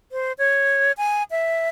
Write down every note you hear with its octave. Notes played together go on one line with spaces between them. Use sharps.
C5
C#5
G#5
E5